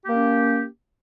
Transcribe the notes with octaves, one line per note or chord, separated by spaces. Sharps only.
A#3 C#4 G4